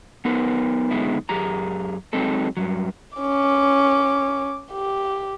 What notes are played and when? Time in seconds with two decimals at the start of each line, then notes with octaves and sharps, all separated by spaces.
0.25 B3 D#4 A#4 B4
0.91 F#2 D3 G#3 B3 D#4 E4
1.29 F#2 G4 G#4 A#5
2.13 F#3 G#3 C4 D#4 A4
2.57 G2 F#3
3.18 C#4 D6
4.72 G4